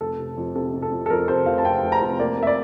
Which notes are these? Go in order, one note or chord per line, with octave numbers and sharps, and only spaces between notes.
F1 A4
C3
F2
C3 A4
C3
A4
F2
A4
F2 A#4
C3 C5
F1 F5
A5
C3 G5
F1
A#5
F1
A#3 D5
A#3 E5
D5